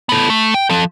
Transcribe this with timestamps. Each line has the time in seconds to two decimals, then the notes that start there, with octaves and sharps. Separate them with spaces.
0.09 B3 A4
0.30 A3
0.54 G5
0.69 F3 A4